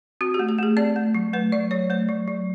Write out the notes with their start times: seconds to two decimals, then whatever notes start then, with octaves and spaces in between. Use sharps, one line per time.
0.21 C4 F#4
0.34 G4
0.39 A3
0.49 G4
0.58 A3 G#4
0.77 C4 D5
0.96 A3
1.15 F#3
1.33 A3 B4
1.52 F#3 D5
1.71 F#3 C#5
1.90 A3 C5
2.09 F#3
2.28 F#3